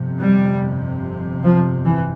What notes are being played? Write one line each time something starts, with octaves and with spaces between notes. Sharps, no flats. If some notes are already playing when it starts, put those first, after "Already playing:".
Already playing: G1 F2 C3
G3
F3
E3